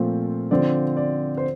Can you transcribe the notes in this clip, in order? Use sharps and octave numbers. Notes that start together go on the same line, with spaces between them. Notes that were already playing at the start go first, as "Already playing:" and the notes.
Already playing: A#2 F3 A3 C4
D3 F3 C4 D5
D5
C5